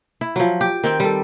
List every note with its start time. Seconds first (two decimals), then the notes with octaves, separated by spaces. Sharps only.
0.21 E4
0.36 F3 F#3
0.61 G4
0.84 D#3 C4 G5
1.00 G3 A4